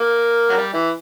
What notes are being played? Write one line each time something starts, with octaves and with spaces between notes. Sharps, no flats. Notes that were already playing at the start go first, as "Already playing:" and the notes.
Already playing: A#3
F#3
G3
E3